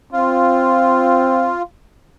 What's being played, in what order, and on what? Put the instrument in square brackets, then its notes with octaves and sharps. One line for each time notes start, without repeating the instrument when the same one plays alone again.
[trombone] C4 [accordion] F4